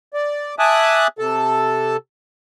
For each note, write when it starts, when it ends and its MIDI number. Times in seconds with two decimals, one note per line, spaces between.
0.14 0.55 74
0.59 1.07 76
0.59 1.07 80
0.59 1.07 81
0.59 1.07 86
0.59 1.07 87
0.59 1.07 90
1.19 1.97 48
1.19 1.97 69
1.19 1.97 81